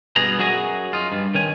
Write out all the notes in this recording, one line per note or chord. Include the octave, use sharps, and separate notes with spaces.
G2 B2 B3 G#4 A#5
F#2 F#3 F#4 G#4 G#5 A#5
D#4 F4
G2
D#3 C#4 G#5